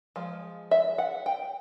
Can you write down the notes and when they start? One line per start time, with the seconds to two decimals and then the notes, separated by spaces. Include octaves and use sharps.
0.16 F3 G#3
0.71 E5
0.98 F#5
1.26 G5